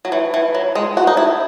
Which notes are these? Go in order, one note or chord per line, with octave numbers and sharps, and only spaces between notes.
F#3
E3
E3
F#3
G#3
F#4
D#4
E4